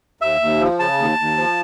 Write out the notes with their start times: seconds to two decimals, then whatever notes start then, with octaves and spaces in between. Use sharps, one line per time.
0.21 D#2 E5
0.41 D#2
0.60 F3
0.79 C#3 A5
0.98 D#2
1.19 D#2
1.37 F3